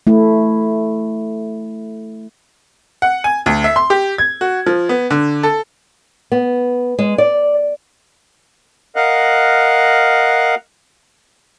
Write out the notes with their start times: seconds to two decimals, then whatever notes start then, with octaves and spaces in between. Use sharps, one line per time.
0.07 A3 E4
3.02 F#5
3.24 G#5
3.46 D2
3.64 E5
3.76 C6
3.90 G4
4.18 G#6
4.41 F#4
4.66 F3
4.89 B3
5.11 D3
5.43 A4
6.32 B3
6.99 G#3
7.18 D5
8.96 A#4 D#5 F5 F#5 F#6